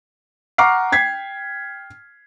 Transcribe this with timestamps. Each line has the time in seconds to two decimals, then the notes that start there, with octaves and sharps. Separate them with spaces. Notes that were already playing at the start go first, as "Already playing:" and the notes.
0.58 F#5 A#5 C#6 D6 F6 C7
0.92 G5 G#6 B6 C7